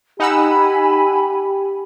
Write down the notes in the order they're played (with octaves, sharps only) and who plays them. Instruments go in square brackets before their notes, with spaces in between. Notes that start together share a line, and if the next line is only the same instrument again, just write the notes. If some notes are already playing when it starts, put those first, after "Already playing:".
[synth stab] D#4 F#5 E6 [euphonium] G4 [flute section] G#5 B5